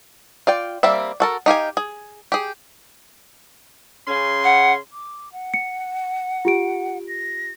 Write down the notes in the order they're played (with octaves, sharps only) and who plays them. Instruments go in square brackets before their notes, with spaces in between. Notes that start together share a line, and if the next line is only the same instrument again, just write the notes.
[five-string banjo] F4 D5 G5
G3 A#3 C4 E5
F#4 A4 A#4
D#4 G4 F5 G#5
G#4
G4 G#4
[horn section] C#3 C#4 C6
[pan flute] F#5
[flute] D6
F#5
[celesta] C#7
F4 G4 D7
[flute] A#6